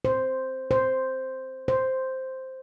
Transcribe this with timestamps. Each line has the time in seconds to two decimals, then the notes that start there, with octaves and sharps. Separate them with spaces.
0.05 C5
0.71 C5
1.68 C5